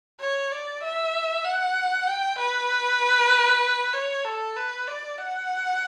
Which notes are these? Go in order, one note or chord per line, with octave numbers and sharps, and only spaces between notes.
C#5
D5
E5
F#5
G5
B4
C#5
A4
B4
D5
F#5